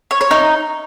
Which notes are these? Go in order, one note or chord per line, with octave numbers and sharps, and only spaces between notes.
C#5
C#5
D#4